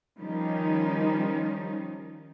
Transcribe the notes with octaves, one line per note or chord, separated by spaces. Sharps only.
D#3 F3 G3 C#4 D#4